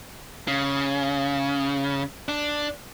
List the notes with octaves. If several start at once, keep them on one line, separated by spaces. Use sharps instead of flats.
C#3
D4